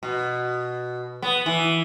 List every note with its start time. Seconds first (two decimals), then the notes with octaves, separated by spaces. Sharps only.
0.03 B2
1.22 B3
1.46 E3